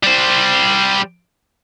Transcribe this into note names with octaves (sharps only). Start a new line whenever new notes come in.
G3 C5